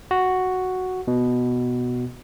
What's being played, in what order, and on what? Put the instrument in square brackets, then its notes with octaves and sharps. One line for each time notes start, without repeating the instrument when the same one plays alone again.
[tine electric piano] F#4
B2